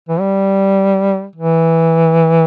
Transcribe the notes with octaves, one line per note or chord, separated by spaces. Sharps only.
E3
G3
E3